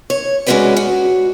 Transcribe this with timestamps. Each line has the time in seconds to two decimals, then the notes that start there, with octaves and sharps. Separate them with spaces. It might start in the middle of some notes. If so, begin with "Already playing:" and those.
0.10 C#5
0.46 G#3 C#4 D4 F#4 B4 D5
0.77 F#4